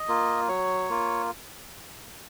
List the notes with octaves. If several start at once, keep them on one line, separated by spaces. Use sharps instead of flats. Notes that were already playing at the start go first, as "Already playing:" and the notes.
Already playing: D#5
A#3 F4
F#3 C#5
A#3 F4